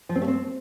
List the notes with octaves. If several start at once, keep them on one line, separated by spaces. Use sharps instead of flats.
F3
C4
A3
C4